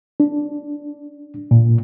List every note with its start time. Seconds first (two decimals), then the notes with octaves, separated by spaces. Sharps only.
0.20 D4
1.51 A#2